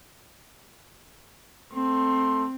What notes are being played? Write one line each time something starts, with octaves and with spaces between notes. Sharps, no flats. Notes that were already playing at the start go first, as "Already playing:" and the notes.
A3 C4 C6